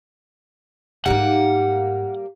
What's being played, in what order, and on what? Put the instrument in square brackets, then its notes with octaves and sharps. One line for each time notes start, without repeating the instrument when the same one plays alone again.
[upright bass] G#2 D#4 [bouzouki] G3 A#3 [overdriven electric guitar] F#5